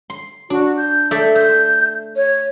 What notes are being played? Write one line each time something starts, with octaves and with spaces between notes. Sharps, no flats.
C6
D4 F#4
G6
A3 D5 E5
E5 G6
C#5